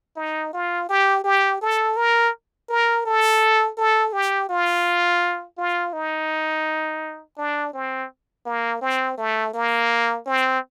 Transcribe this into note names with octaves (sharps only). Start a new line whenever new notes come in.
D#4
F4
G4
G4
A4
A#4
A#4
A4
A4
G4
F4
F4
D#4
D4
C4
A#3
C4
A3
A#3
C4